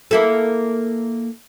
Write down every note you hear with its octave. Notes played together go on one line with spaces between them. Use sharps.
A#3 E4 A4